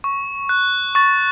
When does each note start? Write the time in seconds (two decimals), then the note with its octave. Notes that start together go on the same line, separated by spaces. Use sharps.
0.04 C#6
0.49 F#6
0.95 C#6 A6